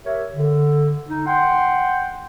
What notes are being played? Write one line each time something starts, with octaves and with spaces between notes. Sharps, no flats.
G4 A#4 C#5 E5
D3
D#4
F#5 G5 C6